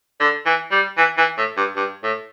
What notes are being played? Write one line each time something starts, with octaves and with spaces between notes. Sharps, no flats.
D3
E3
G3
E3
E3
A2
G2
G2
A2